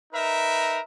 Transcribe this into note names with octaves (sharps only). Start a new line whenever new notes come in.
D#4 A#4 B4 E5 A#5